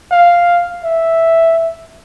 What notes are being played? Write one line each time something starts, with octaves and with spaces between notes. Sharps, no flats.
F5
E5